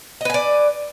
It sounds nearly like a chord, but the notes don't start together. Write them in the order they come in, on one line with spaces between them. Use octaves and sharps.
D#5 B4 G#5 D5